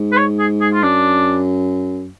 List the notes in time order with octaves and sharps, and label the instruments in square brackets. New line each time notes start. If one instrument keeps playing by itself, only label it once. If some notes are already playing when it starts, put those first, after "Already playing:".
Already playing: [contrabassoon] G#2
[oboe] B4
C#5
G#4
G#4
F4
[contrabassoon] F#2 [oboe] D4